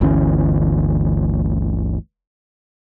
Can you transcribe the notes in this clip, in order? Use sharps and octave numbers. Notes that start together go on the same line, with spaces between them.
G1 D2 E3 C#4